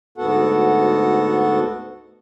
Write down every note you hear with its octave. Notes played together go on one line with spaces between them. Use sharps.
D2 G#2 B3 F#4 A4 F#5